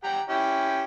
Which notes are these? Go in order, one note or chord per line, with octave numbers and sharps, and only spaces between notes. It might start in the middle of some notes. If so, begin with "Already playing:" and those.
G4 F#5 A#5
C#4 E4 G4